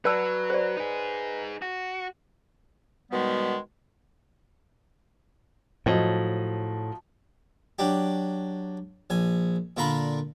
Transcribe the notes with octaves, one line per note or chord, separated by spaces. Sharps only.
F#3 B4 D5 A5 E6
C5 D5
D#4 G#4
F#4
B2 D#3 G3 G#3 B3
A2 F3 F#3 D#5
F#3 D4 G4
A#1 G#5
A#2 D3 F4 A#4 B5